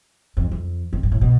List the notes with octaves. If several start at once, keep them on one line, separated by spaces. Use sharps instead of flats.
F2
F2
F2
G2
A2
B2